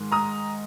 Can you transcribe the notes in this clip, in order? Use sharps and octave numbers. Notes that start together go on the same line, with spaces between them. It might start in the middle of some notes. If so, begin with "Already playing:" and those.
Already playing: G#2 D#3 G#3
A#5 D#6